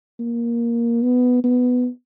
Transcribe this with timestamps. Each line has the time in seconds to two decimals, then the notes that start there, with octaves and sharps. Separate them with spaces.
0.19 A#3
1.03 B3
1.44 B3